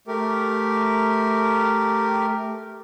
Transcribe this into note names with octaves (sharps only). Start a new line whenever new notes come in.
A3 G4 A#4